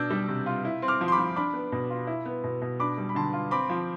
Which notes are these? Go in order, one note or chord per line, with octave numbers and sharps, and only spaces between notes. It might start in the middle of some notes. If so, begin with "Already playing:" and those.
Already playing: B2 D4 E6 G6
G3
C3
F4
E4
C4
D6 F6
F3
C6
B5 D6
F3
D4 B5 D6
B3
B2
F4
E4
B3
B2
B2
D4 B5 D6
G3
B5
D3 A5 C6
F4
C4 B5 D6
F3